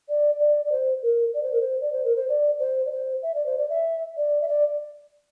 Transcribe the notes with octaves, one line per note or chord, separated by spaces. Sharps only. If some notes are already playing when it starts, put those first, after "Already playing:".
D5
D5
D5
C5
A#4
D5
C5
A#4
C5
D5
C5
A#4
C5
D5
C5
D5
C5
E5
D5
C5
D5
E5
D5
E5
D5